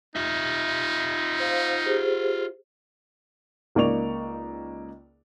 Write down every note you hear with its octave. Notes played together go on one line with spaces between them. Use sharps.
D#4 F4 E5
C5 F5
G4 G#4 C5
C#2 A#3 D#4 D5 C#6 F7